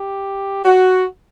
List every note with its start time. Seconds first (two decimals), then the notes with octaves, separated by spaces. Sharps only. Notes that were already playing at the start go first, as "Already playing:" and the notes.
Already playing: G4
0.65 F#4